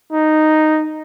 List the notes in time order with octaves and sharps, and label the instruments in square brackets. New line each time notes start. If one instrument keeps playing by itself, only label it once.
[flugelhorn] D#4